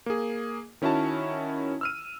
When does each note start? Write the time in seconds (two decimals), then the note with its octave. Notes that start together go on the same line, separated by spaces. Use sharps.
0.06 A#3 G#4
0.82 D#3 C#4 E4 F#4 A5
1.81 E6 F6 D#7